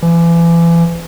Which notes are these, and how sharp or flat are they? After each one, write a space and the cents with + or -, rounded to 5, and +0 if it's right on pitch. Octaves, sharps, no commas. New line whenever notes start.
E3 +35